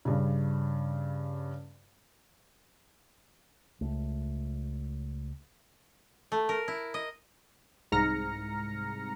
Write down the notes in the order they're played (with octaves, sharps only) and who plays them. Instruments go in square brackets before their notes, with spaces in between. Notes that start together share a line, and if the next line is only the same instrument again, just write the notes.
[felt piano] G2 C#3
[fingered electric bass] C#2 A3
[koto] A3
A#4
E4
D#5
[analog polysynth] C2 G#2 A#5 F6 A#6 C#7